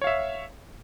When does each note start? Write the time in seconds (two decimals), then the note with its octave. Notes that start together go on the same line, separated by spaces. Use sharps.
0.02 C#5
0.04 F5
0.07 E5